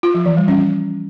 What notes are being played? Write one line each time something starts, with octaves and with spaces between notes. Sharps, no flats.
F4
F3
E3
G3
C#4